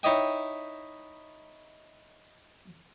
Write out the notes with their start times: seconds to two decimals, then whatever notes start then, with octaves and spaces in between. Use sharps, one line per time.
0.03 D#4 E4 C#5 D#5 G5